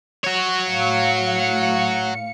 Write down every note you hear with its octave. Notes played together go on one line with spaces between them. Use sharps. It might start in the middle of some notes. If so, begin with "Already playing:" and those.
F#4 C#5
A2 F5 C#7